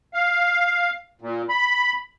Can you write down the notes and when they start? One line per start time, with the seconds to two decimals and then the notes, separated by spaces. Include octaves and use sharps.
0.14 F5
1.22 A#2
1.49 B5